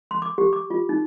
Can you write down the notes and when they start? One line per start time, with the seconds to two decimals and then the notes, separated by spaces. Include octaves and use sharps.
0.11 C6
0.22 D6
0.38 G4
0.53 D6
0.70 F4
0.89 D#4